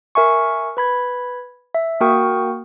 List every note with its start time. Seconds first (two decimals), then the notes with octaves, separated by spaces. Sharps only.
0.15 A#4 E5 G#5 C#6
0.77 B4 B5 G#6
1.74 E5
2.01 A#3 F#4 A#4 G5 C#6 D#6